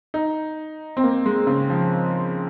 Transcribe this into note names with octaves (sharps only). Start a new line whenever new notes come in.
D#4
C4
A#3
G#3
C#3
F3